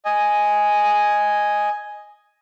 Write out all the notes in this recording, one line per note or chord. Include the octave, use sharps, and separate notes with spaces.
D#5 G#5